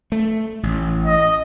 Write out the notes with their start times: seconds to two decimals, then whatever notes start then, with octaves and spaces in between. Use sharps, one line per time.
0.12 A3
0.63 A1
1.06 D#5